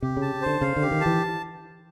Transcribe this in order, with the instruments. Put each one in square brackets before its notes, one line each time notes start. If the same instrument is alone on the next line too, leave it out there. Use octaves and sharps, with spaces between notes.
[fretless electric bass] C3 [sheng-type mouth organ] G4
[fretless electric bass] C#3
[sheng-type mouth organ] A5
[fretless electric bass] D3 [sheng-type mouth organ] C5
[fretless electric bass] C#3 [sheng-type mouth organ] F5
[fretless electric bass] D3
[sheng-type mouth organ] G4
[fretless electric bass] D#3
[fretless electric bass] E3 [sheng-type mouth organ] A5